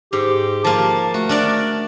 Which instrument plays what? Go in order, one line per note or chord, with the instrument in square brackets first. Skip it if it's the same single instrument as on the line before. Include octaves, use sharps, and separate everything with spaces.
[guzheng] G#2 [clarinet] G4
[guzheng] F3 A#3 [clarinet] A5
[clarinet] A3 [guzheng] F#4
[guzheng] D4 A#4 D5